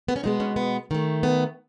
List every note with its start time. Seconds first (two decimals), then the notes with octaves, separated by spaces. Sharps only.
0.08 B3
0.16 C#4
0.23 B2 G#3 B3 D#4
0.40 C#4
0.56 B3
0.91 D#3 A3
1.23 B3